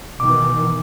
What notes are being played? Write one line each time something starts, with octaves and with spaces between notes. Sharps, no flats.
B2 D#3 E3 D6